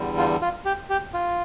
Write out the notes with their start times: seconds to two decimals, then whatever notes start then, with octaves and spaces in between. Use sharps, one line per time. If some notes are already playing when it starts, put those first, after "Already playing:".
Already playing: E2 D3 G3
0.18 F4
0.42 F4
0.65 G4
0.90 G4
1.14 F4